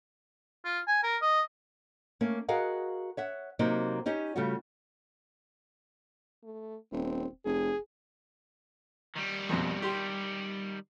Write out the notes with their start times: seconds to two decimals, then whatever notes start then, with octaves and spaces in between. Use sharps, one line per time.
0.65 F4
0.88 G#5
1.03 A#4
1.22 D#5
2.21 A3 A#3 C#4
2.48 F#4 G#4 A#4 D#5 F5 F#5
3.17 C#5 E5 F#5
3.59 C3 F#3 A#3 C4 D#4
4.06 C#4 D#4 G4 C#5
4.36 C#3 G3 A3 F4 F#4
6.44 A3
6.92 D#1 C4
7.45 F1 G#4
9.16 D#3 G3
9.49 A#1 F2 B2
9.82 G4 C6